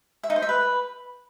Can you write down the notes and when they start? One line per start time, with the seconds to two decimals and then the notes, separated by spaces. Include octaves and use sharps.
0.23 E5
0.30 D#4
0.36 C5
0.42 E5
0.49 B4